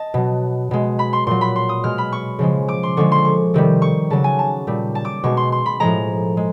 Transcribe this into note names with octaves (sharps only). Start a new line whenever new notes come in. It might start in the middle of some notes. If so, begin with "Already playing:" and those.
Already playing: D#5 A5
B2 F#3
B2 G#3
B5
C6
A#2 F#3 C6
B5
C6
D#6
B2 G#3 F6
B5
C#6
C#3 F3 G#3
D6
C6
D3 F3 G#3 C#6
C6
C#6
C3 D#3 G3
C#6
C#3 F#3 A5
G#5
A5
A#2 G3
A5
D6
B2 G#3 C#6
C6
C6
B5
A2 F3 G#3 A#5
G#3